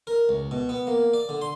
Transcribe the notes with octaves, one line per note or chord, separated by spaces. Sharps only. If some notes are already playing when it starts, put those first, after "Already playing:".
A#4
C#2
B2
B3
A#3
D5
D3
C6